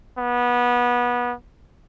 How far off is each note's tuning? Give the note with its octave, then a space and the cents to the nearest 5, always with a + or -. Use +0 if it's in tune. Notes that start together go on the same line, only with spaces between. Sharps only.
B3 -20